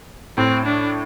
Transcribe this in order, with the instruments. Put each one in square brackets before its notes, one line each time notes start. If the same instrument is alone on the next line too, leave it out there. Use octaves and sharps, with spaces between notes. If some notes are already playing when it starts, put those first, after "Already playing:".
[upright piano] A2 [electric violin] C4
[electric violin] D4